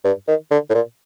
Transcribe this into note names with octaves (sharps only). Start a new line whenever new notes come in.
G2
D#3
D3
A2
A#2